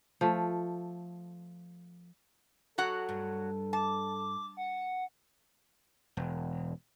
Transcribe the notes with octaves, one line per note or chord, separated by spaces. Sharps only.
F3 A3
F#3 F#4 A4 F#5
G2
A5 D6
F#5
E1